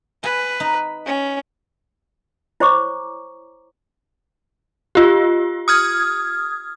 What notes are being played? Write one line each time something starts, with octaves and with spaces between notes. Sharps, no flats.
B4 G#5
D#4
C#4
E4 C5 C#5 A#5 C#6 D6
F4 G4
D#6 F6 G#6